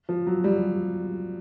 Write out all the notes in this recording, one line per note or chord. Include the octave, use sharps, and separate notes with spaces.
F3
F#3
G3